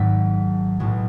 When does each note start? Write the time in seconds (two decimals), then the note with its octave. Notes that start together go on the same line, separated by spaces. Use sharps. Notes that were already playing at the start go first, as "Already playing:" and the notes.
Already playing: G#1 G#2 F#3 E5
0.79 B1 A2 G#3